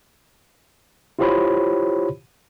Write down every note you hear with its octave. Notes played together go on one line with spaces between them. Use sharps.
E4 F4 G4 C5 C#5 B5